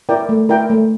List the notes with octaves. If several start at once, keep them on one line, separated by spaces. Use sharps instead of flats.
E4 A#4 D5 G5
A3
E4 A#4 D5 G5
A3